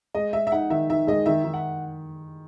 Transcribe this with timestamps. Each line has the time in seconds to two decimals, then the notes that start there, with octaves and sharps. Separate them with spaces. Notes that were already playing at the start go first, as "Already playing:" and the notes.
0.14 G#3 D#5
0.33 G#3 E5
0.47 E5
0.52 D#4 F#5
0.70 D#3 E5
0.90 D#3 E5
1.07 G#3 D#5
1.26 D#3 E5
1.44 D#3
1.54 F#5